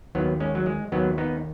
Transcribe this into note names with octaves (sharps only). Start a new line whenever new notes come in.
D#2 D#3 F#3 B3
G#3 C#4
F#3
G#3
D#2 D#3 F#3 B3
B3 D#4